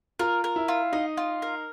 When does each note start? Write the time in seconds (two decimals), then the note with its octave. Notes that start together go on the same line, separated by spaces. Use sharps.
0.19 F4 A#4
0.44 A#4
0.56 E4
0.68 F4
0.92 D#4 D#5
1.17 F4
1.42 A#4